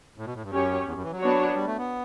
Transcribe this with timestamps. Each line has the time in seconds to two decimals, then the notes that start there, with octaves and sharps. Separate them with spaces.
0.18 A2
0.26 B2
0.35 A2
0.43 G2
0.52 F#2 C#4 G4 C#5
0.86 E2
0.95 F#2
1.04 E3
1.12 F#3
1.20 B3 D4 F#4 C#5
1.55 G3
1.67 A3
1.78 B3